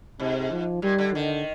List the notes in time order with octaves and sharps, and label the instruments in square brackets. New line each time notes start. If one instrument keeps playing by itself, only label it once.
[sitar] G#2 [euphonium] C3
[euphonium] F3
[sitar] A#2 [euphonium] G3
[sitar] D3
[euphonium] D3 [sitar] D#3